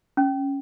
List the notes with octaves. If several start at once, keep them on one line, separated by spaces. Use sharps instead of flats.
C#4